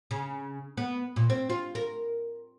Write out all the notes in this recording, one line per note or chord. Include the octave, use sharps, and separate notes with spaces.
C#3
B3
A#2
C4
F4
A#4